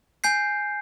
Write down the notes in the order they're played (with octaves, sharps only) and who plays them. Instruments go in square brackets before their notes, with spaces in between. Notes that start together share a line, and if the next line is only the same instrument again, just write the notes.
[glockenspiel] G#5 G6 C7